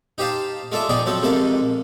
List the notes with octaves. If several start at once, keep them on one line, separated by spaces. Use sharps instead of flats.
D#4 G4 C5 F5 A5
G#3 F4 A4 D5 E5
F3 D#4 G#4 D5 G5
F3 F#3 C4 A4
F2 G#2 C3 A4 A#4 F5